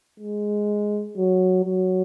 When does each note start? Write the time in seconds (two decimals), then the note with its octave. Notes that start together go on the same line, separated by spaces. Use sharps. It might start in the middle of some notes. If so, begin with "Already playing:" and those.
0.20 G#3
1.17 F#3
1.65 F#3